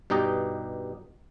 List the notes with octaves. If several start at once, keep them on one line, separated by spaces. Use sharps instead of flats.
G2 B2 D#4 G4 D#5